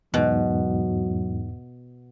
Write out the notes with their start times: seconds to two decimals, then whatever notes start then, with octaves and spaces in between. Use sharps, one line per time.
0.14 E2 G#2 B2 F#3